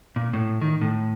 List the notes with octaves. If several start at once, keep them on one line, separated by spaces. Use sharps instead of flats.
A#2
A2
D#3
A2